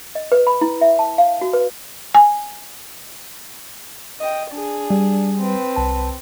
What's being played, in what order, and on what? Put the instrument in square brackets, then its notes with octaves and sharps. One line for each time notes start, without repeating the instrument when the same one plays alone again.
[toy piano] D#5
B4
B5
E4
E5
A5
F5
F#4
B4
[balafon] G#5
[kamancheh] D#5 G5
D4 G#4
[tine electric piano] G3
[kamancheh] C4 B4
[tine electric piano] C2 A5